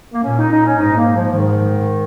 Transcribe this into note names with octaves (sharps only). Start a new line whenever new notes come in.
A#3
A#2 C#4
D#4
D#4
C#4
G#2 D#4
G#3
A#3
F3
G#2 D#3